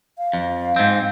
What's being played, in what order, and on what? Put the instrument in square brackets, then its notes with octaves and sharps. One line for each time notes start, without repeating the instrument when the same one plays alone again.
[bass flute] F5
[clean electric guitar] F2
G#2 C4